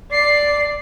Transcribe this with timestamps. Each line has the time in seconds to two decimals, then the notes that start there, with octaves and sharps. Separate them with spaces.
0.12 D5 C7